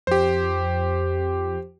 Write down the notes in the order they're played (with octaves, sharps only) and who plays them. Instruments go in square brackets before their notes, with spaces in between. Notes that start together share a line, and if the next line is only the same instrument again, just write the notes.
[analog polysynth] F2 [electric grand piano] G4 C5